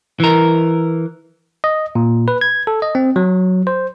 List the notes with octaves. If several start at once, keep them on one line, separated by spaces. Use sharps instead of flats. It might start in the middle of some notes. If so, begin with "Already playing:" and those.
E3 A#4
D#5
A#2
B4
G#6
A4
D#5
C4
F#3
C5